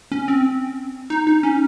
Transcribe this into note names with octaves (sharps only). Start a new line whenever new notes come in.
C#4
C4
D#4
D#4
C#4